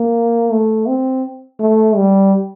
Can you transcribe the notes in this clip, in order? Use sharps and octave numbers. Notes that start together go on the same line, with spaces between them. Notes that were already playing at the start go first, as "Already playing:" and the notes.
Already playing: A#3
A3
C4
A3
G3